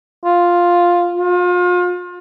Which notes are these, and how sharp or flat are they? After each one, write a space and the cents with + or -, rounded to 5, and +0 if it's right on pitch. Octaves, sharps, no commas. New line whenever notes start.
F4 +5
F4 +35